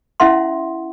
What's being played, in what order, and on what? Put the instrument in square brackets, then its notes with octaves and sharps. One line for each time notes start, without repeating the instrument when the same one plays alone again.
[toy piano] C#4 E4 E5 F#5 C6